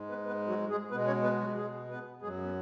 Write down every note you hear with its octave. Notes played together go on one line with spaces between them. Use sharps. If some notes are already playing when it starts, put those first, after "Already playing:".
Already playing: G#2 G#3
B3 B4
B3 B4
F#3 F#4
G#3 G#4
B2 G#3 B3 B4
C#4 C#5
B3 B4
F#3 F#4
G#3 G#4
B3 B4
F#2 F#3 G#3 G#4
B3